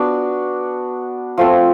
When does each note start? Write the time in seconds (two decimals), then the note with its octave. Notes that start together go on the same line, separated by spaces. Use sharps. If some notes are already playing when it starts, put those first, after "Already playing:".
Already playing: B3 D4 F#4
1.37 F3 A3 C4